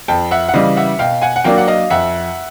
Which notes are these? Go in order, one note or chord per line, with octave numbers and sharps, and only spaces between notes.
F2 G5 A5
E5 F#5
F#5
C#3 E3 G3 D#5 F5
E5 F#5
B2 F5 G5
F#5 G#5
F#5
F#3 A#3 D4 F5 G5
F#5
D#5 F5
F2 E5 F#5